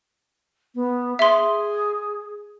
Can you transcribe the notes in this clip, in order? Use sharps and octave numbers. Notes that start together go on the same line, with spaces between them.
B3
G#4 E5 C6